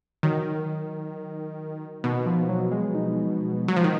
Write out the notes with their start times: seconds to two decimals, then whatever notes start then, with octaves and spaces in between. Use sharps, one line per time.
0.23 D#3 F#3
2.04 B2 D#3
2.26 F3
2.49 F#3
2.72 G#3
2.95 D#4
3.68 F#3
3.76 F3
3.84 D#3